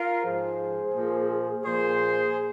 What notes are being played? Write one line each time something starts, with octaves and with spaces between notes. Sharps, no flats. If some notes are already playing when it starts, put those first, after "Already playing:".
Already playing: F4 A#4
G#2 F3 G#4 C5
A#2 F3
A#2 F3 G#4 C5